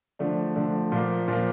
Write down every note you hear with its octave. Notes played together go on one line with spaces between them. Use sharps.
D3 F3 A3 D4
D3 F3 A3 D4
A#2 F3 A#3
A#2 F3 A#3